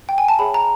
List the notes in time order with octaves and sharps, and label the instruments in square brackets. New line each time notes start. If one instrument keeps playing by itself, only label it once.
[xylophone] G5
G#5
A5
G#4 C#5 E5 G5 B5
A#5